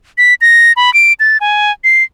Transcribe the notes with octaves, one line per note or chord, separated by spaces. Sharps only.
B6
A#6
B5
D7
A6
G#5
C7